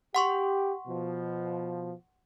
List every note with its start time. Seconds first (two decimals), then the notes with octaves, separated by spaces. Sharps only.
0.15 G4 F#5 C6 C#6
0.87 B2 F3